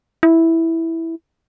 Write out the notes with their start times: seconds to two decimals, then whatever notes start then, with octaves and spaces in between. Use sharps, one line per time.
0.23 E4